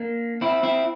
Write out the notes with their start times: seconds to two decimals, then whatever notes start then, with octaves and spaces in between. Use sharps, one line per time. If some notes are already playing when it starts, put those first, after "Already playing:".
Already playing: A#3 D4
0.41 C4 E4
0.63 C4 E4